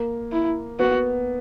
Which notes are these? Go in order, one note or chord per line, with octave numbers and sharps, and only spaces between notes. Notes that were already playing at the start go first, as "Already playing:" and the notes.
Already playing: A#3
E4
B3 F#4